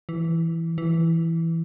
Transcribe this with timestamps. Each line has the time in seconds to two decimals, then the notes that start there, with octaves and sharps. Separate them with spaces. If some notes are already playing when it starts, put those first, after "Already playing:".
0.09 E3
0.78 E3